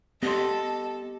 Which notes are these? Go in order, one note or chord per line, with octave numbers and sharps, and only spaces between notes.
B3 G4 A4 D#5 C6